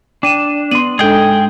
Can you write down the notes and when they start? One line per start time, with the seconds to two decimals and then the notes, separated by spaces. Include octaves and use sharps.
0.23 D4 G5 D#7 E7
0.71 B3 C6 D#7 F#7
0.99 G#2 D4 G#4 A4 D#5 G5